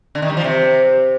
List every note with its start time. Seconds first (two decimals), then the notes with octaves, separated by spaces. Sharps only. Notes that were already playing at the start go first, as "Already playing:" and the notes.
0.15 D3
0.22 D#3
0.30 G3
0.37 F3
0.44 C3